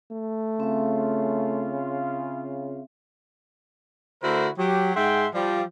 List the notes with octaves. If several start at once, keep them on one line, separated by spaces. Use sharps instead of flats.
A3
C#3 C4 F4 E5
D3 A3 E4 F#4 A#4 C5
F#3 G4
G#2 G#4 E5 F#5 G5 C6
F3 G3